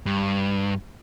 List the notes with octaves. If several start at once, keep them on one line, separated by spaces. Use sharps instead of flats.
G2